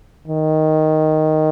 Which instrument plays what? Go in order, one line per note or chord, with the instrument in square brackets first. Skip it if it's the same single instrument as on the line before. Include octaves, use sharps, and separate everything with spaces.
[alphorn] D#3